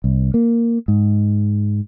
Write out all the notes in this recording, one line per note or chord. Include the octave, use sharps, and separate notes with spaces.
C2
A#3
G#2